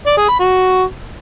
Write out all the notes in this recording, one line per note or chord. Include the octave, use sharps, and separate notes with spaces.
D5
G#4
B5
F#4